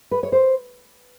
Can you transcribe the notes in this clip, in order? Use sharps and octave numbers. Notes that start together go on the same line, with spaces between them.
B4
C#5
C5